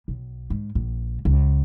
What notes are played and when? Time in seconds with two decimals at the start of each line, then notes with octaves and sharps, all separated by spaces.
0.08 B1
0.50 G#2
0.75 A#1
1.25 C#2